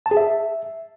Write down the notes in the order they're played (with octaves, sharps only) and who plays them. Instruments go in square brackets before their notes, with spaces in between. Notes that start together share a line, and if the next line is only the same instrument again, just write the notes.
[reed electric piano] A5
G#4
E5